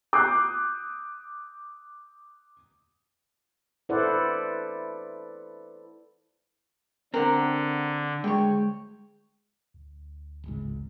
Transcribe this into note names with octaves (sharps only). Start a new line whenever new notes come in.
D6 D#6 F#6 G6 C7
E4 A4 B4 C5 D5 F#5
D3 C4 A#4 F#5
D2 G#3 C#5 G5
D2
D1 G#1 C#2